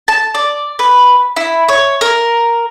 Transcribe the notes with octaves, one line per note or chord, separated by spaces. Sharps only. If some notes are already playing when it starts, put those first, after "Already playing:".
A5
D5
B4
E4
C#5
A#4